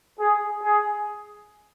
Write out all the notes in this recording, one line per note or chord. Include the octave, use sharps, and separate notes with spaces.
G#4
G#4